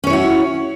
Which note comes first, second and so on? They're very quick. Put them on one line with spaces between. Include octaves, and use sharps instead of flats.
C#4 C#5 E4 F#4